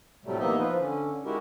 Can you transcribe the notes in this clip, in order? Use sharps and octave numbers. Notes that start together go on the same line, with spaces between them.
A2 C3 F#3 G3 A3
E3 A#3 B3 D#4 D#5 E5
F3 F4 B4
D3 C#4
G#3 D#4 E4 F#4 G4 A#4